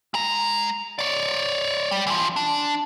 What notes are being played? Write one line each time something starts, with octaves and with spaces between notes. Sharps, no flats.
G#3 A#5
C#5 D5
G3
E3 F3
D4